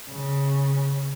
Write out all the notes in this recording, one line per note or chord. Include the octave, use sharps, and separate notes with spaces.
C#3